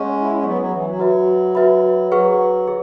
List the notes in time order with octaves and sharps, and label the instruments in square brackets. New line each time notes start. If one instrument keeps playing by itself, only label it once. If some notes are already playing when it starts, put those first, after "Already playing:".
Already playing: [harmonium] G#3 C#4 [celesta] C#5 F#5 C#6
[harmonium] E4
C#4
[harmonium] F#3 B3 [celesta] C#5 F#5 C#6
[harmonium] F#3
E3
F#3
[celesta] F#4 B4 E5 B5
F#4 B4 E5 B5
[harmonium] F#3 [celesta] G#4 B4 F#5 C#6
[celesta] G#4